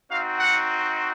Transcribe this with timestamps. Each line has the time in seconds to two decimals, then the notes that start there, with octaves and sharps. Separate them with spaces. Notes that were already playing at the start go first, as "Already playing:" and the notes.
0.10 C4 D#4 F#4 F5
0.39 F#5